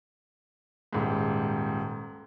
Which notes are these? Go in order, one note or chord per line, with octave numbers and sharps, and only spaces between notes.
D#1 G#2